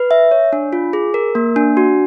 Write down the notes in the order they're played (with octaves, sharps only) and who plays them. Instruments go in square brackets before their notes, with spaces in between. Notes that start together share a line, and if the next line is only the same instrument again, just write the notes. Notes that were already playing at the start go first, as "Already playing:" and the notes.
Already playing: [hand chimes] B4
E5
C#5
D4
F4
G#4
A#4
A#3
D4
F#4